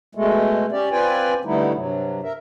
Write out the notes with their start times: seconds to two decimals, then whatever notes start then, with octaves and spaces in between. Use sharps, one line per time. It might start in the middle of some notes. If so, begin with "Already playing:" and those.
0.15 B2 G#3 A3
0.72 C#4 G4 D5
0.92 C4 F4 B4 D5 G5 G#5
1.45 D3 G3 A3 B3 D#4 E4
1.74 G2 C3 F#3
2.23 A#4 E5